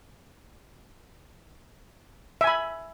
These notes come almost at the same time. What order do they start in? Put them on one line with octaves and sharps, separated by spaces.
E5 G#5 B5